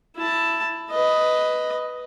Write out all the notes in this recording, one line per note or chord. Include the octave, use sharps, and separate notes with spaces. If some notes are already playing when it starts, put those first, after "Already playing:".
E4 A5
B4 D#5